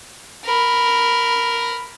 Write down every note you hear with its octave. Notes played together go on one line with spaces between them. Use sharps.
A#4 B5